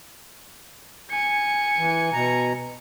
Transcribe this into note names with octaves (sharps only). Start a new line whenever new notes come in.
G#5 C#7
E3
B2 A#5